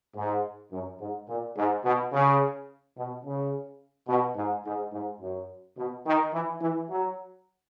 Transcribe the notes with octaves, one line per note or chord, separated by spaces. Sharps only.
G#2
F#2
G#2
A#2
G#2
B2
C#3
B2
C#3
B2
G#2
G#2
G#2
F#2
B2
D#3
E3
E3
F#3